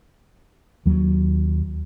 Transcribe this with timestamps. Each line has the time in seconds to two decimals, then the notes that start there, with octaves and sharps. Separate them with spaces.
0.86 D#2 F#3